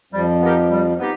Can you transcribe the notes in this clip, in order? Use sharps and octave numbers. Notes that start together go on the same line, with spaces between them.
F2 F3 G3
B3 D#4 G4 A#4
G3
B3 D#4 G4